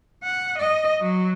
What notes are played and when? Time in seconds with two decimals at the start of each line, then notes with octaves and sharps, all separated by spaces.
0.24 F#5
0.59 D#5
1.01 F#3